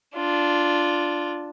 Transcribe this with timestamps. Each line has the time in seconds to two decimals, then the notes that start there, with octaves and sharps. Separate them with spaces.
0.16 D4 F4